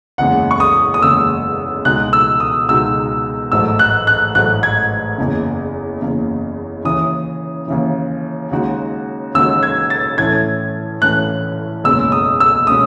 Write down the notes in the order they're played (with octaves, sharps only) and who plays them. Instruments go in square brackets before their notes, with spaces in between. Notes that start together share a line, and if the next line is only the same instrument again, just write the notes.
[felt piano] F#1 E2 C#3 G#3 [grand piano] F#5
[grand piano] C#6
D#6
D#6
[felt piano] F#1 E2 C#3 G#3 [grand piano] E6
[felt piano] C#2 B2 G#3 D#4 F#4 [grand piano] F#6
[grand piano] E6
D#6
[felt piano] C#2 B2 G#3 D#4 F#4 [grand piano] E6
[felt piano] A1 G#2 F#3 A3 [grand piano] E6
[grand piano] F#6
F#6
[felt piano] A1 G#2 F#3 A3 [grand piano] F#6
[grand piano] G#6
[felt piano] F#1 E2 C#3
F#1 E2 C#3
[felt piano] D#2 C#3 E3 [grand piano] D#6
[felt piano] D#2 C#3 E3
D#2 C#3 G#3 D#4 F#4
[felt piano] D#2 C#3 G#3 D#4 F#4 [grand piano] E6
[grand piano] G#6
A6
[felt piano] A2 E3 A3 C#4 [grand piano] G#6
[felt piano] A2 E3 A3 C#4 [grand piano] F#6
[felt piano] F#1 E2 B2 G#3 C#4 [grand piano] E6
[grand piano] D#6
E6
[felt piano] B2 G#3 C#4 [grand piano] D#6